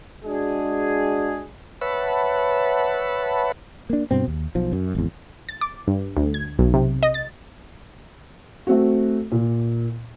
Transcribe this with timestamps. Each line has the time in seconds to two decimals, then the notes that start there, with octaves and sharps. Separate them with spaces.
0.25 G#3 D4 F#4 G#4
1.81 B4 C#5 E5 F#5 A5 B5
3.90 A#3 D4
4.11 G2 B2 C4
4.28 D#2
4.55 B1 F3
4.72 F#2
4.95 G#1 E2
5.49 A6
5.61 D6
5.87 G2
6.17 D2
6.34 G#6
6.59 B1
6.74 C3
7.03 D#5
7.14 A6
8.67 A3 C4 F#4
9.32 A#2